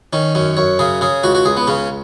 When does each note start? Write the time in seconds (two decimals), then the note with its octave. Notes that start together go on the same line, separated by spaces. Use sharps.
0.13 D#3 C#4
0.35 F#2 C#4
0.57 F#2 C#5
0.79 C#3 G#4
1.01 C#3 G#4
1.23 C#2 F#4
1.35 F#4
1.45 C#2 G#4
1.57 B3
1.67 C#3 C#4